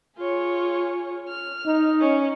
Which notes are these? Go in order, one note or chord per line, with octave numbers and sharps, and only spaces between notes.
F4 G#4 C#5
F6
D#4
C#4